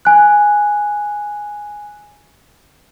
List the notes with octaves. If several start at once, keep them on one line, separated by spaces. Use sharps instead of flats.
G#5 F#6